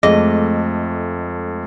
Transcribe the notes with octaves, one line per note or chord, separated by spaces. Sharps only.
F2 G#3 A3 G#4 D#5